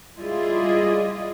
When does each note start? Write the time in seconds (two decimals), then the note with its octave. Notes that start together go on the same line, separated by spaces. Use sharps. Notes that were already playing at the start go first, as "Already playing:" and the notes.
0.18 G3 E4 F4 G#4 D5 D#5